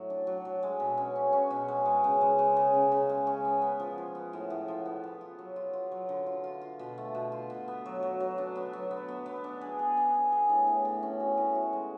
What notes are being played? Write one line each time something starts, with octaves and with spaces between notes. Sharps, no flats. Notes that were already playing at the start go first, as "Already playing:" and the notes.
Already playing: A2 F#3
D4
F#3
F#3
G#3
B2
C#4
C#4
C#4
B2
G#3
G#3
C#3
G#3
C#3
C#3
C#3
C#3
G#3
C#4
B3
B3
F3
F3
B3
A2
A2
F3
B3
B3
F4
F#3
F4
F4
F#3
D3
F4
F4
F4
B2
A3
B2
F4
B2
B3
F#3
F#3
F#3
D4
B3
F#3
B3
B3
B3
D4
G#4
G#4
D4
G#4
G#4
A2
A2
A2
C#4
F#4
A2
F#4
G#3